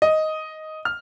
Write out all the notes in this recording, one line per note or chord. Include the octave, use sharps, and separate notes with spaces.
D#5
F6